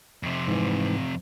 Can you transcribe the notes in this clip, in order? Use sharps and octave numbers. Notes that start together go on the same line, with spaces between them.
F2 C3
G#2 E3